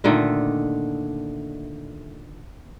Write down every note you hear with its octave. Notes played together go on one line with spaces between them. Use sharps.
A#2 D3 D#3 A3